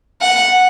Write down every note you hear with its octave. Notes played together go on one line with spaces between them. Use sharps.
F#5